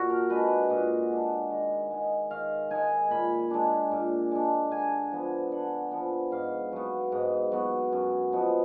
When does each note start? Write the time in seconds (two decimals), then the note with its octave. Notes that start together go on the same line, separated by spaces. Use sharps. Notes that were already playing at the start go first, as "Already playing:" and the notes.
Already playing: A#2 F#4
0.10 A#4
0.30 G#3 D4 B4
0.70 A#2 D#5
1.10 G#3 D4
1.50 D#3
1.91 G#3 D#4
2.31 D#3 F5
2.71 G#3 D#4 G#5
3.11 A#2 B5
3.50 G#3 D4
3.91 A#2
4.31 G#3 D4
4.71 D3 G#5
5.11 F3 B3
5.52 D3 F#5
5.91 F3 B3
6.32 G#2 F5
6.72 F#3 B3
7.12 G#2
7.52 F#3 B3
7.92 F#2
8.33 F3 B3 D#4